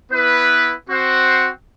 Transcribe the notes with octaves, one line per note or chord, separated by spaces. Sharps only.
B3 E4 B4
C4 F#4 C5 F#5